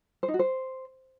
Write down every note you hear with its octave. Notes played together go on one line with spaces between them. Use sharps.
C5
D#4
F#4
C5